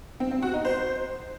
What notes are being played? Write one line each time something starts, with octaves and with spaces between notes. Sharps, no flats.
C4
C4
F#4
D#4
C5